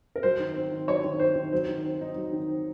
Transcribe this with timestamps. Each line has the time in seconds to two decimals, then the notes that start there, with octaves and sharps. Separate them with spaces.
0.16 A#4
0.23 F#3 C5
0.39 D#3
0.56 C4
0.72 D#3
0.88 F#3 C#5
1.04 D#3
1.20 C4 C5
1.36 D#3
1.52 F#3 C5
1.69 D#3
1.85 C4
2.01 D#4
2.16 F#3
2.32 D#3
2.48 C4